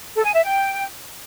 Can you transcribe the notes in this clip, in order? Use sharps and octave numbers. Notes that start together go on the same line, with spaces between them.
A4
G#5
E5
G5